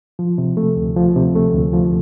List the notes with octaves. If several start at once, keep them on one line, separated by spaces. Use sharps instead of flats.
F3
C3
A3
D2
F3
C3
A3
D2
F3